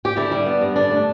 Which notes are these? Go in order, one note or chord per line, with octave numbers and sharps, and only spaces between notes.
G4
D3 E4
G3
B3
G2
D3 D4
A3